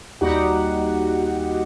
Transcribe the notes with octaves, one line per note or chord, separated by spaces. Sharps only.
D#2 G3 D#4 F#4 G4 F#5